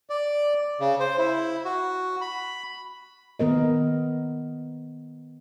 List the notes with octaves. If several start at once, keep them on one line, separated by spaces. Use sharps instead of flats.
D5
C#3
C5
E4
F#4
B5
D#3 B3 A#4 D#5